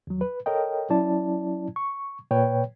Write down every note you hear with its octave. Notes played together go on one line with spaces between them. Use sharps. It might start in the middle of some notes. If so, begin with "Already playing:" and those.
D#2 F#3
B4
A4 A#4 C#5 D#5 G5
F#3 C#4 E4 D5 A5
C#6
A#2 B4 C#5 G5